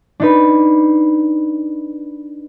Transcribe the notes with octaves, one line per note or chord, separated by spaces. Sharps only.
D4 D#4 B4